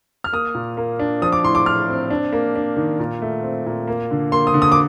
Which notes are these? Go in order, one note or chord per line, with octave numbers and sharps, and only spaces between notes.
F6
A#3 D#6
A#2
A#3
D4
F3 D#6
D6
A2 C6
D6
A2 F6
C4
D4
A#3
D4
D#3
A#2
A3
C4
A#2
A#3
D3
A#3 C6
D#6
D3
D#6
D6